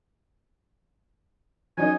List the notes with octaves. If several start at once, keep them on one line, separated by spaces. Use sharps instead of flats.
F#3 C#4 D#4 G#5